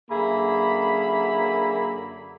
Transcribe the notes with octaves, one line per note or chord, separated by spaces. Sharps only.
F#2 D3 A#3 G#4 E5 B5